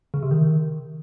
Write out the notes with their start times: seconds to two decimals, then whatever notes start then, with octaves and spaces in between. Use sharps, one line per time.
0.14 C#3
0.22 C3
0.31 D#3